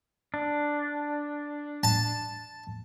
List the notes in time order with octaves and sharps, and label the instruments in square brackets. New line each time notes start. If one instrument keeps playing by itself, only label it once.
[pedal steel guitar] D4
[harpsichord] A5